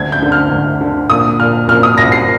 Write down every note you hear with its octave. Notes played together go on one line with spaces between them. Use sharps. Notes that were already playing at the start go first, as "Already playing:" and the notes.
Already playing: D2 G#6
G6
D3
F6
D2
D3
A#2 D#6
A#2 F6
A#2 F6
D#6
C2 A#6
C7